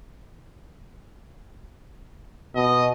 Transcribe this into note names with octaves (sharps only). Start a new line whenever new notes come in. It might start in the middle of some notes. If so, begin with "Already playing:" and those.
B2 D#5